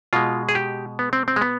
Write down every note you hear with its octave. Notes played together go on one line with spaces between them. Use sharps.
B2 G#3 F4
G#4
G4
B3
C4
C4
G#3
B3